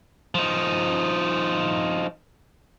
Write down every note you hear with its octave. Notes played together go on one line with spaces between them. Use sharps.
F3 D#4